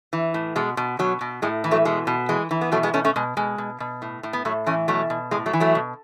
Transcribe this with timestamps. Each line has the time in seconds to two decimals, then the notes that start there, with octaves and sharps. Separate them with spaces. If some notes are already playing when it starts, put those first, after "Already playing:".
0.13 E3
0.34 A2
0.56 B2 G#3
0.77 B2
0.99 B2 F#3
1.21 B2
1.42 A2 G#3
1.64 E3
1.71 F#3 A3
1.85 B2 G#3
2.07 B2
2.29 E3 G#3
2.51 E3
2.61 B3
2.72 B2 F#3 A3
2.83 G#3 B3
2.93 B2 A3 C#4
3.05 A3 C#4
3.16 B2 G#3
3.37 B2 G#3
3.58 B2
3.80 B2
4.02 A2
4.23 A2
4.33 B3
4.45 A2 F#3 A3
4.66 E3 A3 C#4
4.88 B2 F#3 A3
5.10 B2
5.31 A2 G#3
5.46 F#3 A3
5.53 E3
5.60 F#3 A3
5.75 B2